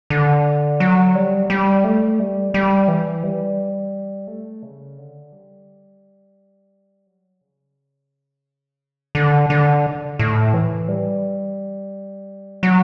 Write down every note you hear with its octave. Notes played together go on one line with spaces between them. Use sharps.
D3
F#3
G3
G3
A3
G3
G3
E3
G3
A3
C#3
D3
G3
F#3
C#3
D3
D3
A2
E3
G3
F#3